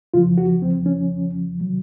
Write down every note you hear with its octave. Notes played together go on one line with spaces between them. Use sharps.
F2 C#3 F3 F4
F#4
C4
C#4
C3 D#3 F#3